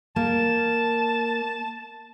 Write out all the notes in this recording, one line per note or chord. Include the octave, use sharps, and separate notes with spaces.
A#3 A5